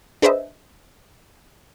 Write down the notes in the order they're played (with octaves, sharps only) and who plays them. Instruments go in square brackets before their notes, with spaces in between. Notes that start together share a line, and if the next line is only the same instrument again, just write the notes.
[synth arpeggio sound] D4 G#4 B4 C5 D#5 E5